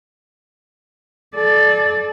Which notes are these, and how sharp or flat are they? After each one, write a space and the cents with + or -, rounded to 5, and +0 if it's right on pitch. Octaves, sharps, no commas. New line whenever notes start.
A4 -35 D5 +10